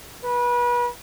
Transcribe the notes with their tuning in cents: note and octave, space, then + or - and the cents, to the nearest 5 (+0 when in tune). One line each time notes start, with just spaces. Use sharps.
B4 -30